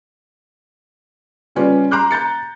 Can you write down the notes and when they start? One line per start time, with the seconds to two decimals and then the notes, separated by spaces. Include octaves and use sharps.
1.55 C#3 G3 C#4 F4 B4 D5
1.91 A#5 C6 D6 F#6 G6
2.11 A#5 G6 A6 C#7